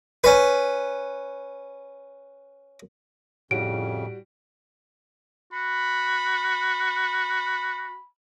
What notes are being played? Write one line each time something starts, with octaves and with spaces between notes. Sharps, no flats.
C#4 B4
F2 A2 C#3 G3 F#4 D7
F#4 B5